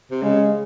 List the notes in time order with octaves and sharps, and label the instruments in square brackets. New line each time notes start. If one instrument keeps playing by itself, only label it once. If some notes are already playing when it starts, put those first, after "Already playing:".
[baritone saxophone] C3
[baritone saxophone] C#3 [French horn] G#3